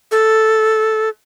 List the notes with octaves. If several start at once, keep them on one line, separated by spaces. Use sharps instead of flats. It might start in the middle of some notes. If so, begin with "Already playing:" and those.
A4